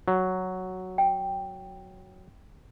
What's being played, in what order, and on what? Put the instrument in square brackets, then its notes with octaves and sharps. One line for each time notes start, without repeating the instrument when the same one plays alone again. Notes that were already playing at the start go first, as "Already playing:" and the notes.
[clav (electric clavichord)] F#3
[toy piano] G5